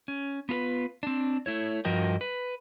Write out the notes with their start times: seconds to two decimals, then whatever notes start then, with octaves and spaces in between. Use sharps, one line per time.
0.08 C#4
0.49 B3 F4 A#4 B4
1.03 C4 D4
1.46 A3 E4 C#5
1.85 G2 F3 F#4 A#4 D#5 G5
2.21 B4